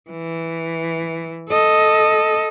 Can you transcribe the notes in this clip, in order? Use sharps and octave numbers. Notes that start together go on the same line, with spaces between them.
E3
A4 D#5